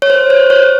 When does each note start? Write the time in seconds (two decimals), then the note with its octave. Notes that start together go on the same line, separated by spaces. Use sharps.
0.02 C#5
0.10 C5
0.30 C5
0.50 C#5